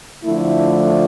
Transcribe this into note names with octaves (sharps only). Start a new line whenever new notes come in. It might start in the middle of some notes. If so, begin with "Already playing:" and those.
D3 F3 A3 E4